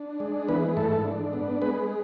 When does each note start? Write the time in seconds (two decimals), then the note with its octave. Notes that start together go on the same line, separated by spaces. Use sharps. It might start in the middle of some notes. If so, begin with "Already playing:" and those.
Already playing: D4
0.20 G#3
0.48 E3 B3 B4
0.77 G#2 A3 A4
1.05 D4
1.33 B3
1.62 G#3 B3 B4